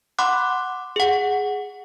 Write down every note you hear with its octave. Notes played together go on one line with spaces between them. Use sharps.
F#5 B5 C6 D6 F#6
G#4 F#5